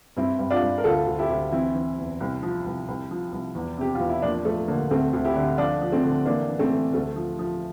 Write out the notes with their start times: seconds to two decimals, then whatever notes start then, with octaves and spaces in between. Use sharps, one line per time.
0.17 G2 C4 E4
0.39 G2
0.51 D4 F4
0.62 G2
0.78 A#4
0.84 D2 F4 A4
1.07 D2
1.18 E4 G4
1.30 D2
1.52 E3 C4 E4
1.75 E3
1.98 E2
2.20 C2
2.43 F3
2.66 C2
2.88 C2
3.11 F3
3.32 C2
3.55 E2
3.78 C3 G4
3.95 E2 F4
4.09 E4
4.22 F3 A#3 D4
4.45 F3 A3
4.68 D3 A#3
4.91 D2 A3 C4
5.13 D2
5.25 E4 G4
5.36 D3
5.58 F3 D4 F4
5.82 F3
5.92 A3 C4
6.03 D3
6.26 E3 A#3 D4
6.48 E3
6.59 A3 C4
6.71 E3
6.94 D2 A3
7.16 F3
7.39 F3